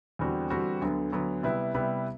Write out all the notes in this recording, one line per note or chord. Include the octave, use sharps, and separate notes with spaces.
E2 D3 G3 C4 F#4
E2 D3 G3 C4 F#4
D2 D3 F#3 B3
D2 D3 F#3 B3
C3 G3 B3 E4 B4
C3 G3 B3 E4 B4